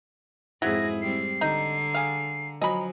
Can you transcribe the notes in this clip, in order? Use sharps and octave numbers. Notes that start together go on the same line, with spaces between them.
F2 G#2 F#3 E4 G#4 A#6
G3 C4 C7
D3 D#4 A#5
G#4 F5
F3 F#3 D#5 G#5 A#5 B5